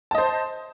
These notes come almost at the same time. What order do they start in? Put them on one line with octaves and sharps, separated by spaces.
A5 D#5 C5